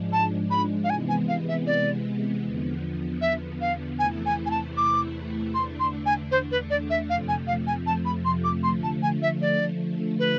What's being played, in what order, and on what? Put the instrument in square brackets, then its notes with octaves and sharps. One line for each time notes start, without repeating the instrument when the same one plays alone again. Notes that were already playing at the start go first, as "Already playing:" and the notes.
Already playing: [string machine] G#2 F3 G#3 D4
[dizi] A5
B5
F5
[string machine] C3 E3 G#3 B3 [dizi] G#5
[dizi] G#5
F5
E5
D5
[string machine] E2 D3 F3 B3
[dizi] E5
F5
[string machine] E2 C3 E3 A3 E4 [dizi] G#5
[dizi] G#5
G#5
A5
D6
[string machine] E2 D3 A3 D4 [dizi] C6
[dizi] C6
G#5
C5
B4
D5
E5
[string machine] F2 C3 F3 A3 [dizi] F5
[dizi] G#5
F5
G#5
A5
B5
C6
D6
[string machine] D3 F3 A3 [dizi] C6
[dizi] A5
G#5
E5
D5
B4